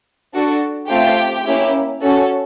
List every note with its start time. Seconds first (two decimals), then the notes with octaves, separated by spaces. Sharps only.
0.34 D4 F#4 A4
0.89 A3 C4 F4 G4 G5
1.46 A#3 C#4 E4 G4
2.02 C#4 F#4 A4